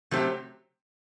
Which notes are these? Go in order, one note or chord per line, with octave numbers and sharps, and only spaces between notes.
C3 F#3 A3 C4 G4